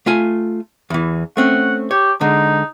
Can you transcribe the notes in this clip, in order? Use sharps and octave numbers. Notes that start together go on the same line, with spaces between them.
A3 F4 G#5
E2 E3
A3 C4 C#4 F#5
G4 C#5
D3 G#3 D#4